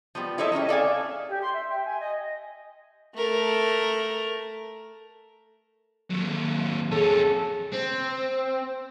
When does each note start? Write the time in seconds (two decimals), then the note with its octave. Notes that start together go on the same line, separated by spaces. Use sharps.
0.15 F3 G3 B3
0.38 E4 A4 C#5 D#5 E5
0.52 G3 C#4 A4 D#5
0.69 A4 D5 F5 G#5
1.29 G4
1.42 C6
1.54 E5
1.69 G5
1.85 G#5
2.00 D#5
3.15 A3 A#4
6.10 D#2 F#3
6.91 F2 C#4 G#4 A4
7.73 C4